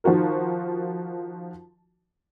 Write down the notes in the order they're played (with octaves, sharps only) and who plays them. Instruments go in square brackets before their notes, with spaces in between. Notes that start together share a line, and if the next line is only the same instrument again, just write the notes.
[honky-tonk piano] D#3 F3 F4 F#4 A#4